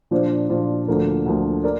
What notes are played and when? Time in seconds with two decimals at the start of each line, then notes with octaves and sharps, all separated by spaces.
0.11 A#2 F3 D4 F4 C5
0.49 A#2 F3 D4 F4 C5
0.88 D2 D3 F3 A#3
1.26 D2 D3 F3 A#3
1.64 A#4 D5